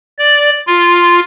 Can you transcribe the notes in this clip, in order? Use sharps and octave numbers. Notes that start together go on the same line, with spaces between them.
D5
F4